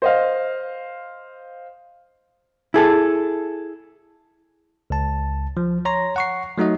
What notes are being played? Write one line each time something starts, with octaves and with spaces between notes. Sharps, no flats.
C5 D#5 F5
E4 G#4 A4
C#2 A5
F3
C#5 A#5 C6 A#6
F#5 C#6 C7
F#3 A3 D#4 F#4 D#5